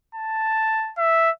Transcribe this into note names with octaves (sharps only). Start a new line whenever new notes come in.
A5
E5